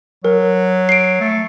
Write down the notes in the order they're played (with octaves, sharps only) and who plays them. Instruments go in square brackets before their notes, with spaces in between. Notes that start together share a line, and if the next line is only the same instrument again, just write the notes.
[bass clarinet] F#3 [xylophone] A#4
[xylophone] C7 D7
[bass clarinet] A3